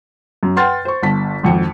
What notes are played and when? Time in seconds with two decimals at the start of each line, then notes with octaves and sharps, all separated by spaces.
0.43 F#2
0.56 B4 F#5 G5 C6 F6 A6
0.85 C5 C#6
1.02 G1 A5 B6
1.43 G#1 F2 C#7